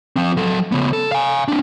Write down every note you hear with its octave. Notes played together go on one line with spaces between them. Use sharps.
F3 C4
F#3 A4
C#3 B3
A4
F5 G#5
C4 D4